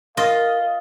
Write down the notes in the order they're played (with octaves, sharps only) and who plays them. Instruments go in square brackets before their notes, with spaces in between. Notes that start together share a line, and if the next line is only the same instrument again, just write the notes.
[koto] F4 D#5 [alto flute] A#4 [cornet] F5